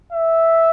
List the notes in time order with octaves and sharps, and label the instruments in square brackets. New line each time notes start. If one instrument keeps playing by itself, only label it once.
[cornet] E5